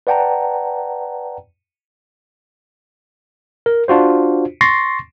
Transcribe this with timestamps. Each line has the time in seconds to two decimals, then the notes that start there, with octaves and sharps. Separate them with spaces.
0.07 B4 D5 F#5 G5 A5 A#5
3.66 A#4
3.88 D4 F4 F#4 C5
4.61 C6 C#6 A6 A#6 C7